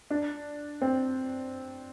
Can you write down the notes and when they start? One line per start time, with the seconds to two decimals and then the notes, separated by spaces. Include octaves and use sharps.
0.11 D4
0.82 C4